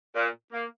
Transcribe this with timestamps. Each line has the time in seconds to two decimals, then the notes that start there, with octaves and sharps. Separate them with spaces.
0.15 A#2
0.52 A#3